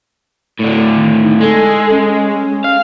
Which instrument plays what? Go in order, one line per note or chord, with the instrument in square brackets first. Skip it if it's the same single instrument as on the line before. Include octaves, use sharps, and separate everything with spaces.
[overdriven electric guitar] A2 D3
[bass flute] D#3
D#4
[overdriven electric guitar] G#3 [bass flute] A4
[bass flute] C#4
[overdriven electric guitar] F5